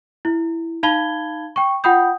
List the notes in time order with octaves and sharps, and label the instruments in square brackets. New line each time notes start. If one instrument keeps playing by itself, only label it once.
[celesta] E4
D#4 F5 A5 B5 G#6 G7
G5 C#6
F4 F#5 G5 B5 D#6 G6